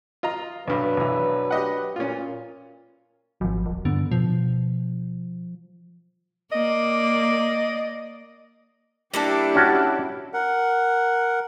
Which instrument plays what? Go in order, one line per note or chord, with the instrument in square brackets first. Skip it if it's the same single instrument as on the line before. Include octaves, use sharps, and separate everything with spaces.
[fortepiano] F4 D#5 A#5
[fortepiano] B1 G2 [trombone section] F#3 D4 B4
[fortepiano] B1 E3
G4 D#5 F#5
[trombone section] A#2 [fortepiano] C#4 F4
[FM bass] G#1 [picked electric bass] F3 F#3
[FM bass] D#1
[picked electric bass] G2 B3 [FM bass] D3
[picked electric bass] B2 [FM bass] F3
[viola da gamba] A#3 D5 [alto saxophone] D#5
[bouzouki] G3 A#3 A4 [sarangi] D4 [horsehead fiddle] E4 G4
[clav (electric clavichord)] C#4 F#4 A5
[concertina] A#4 F#5